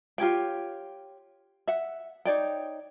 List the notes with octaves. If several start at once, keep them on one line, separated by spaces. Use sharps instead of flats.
F4 G4 C#5 G5
E5 F#5
D#4 C#5 D5 G5